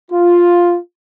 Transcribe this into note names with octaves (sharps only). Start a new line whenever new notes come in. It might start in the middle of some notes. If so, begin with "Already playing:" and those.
F4